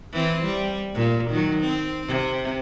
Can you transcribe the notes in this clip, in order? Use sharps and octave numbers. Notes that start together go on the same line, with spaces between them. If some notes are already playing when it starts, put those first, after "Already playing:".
E3 C4
G3
A#2
D#3 F#3
C4
C3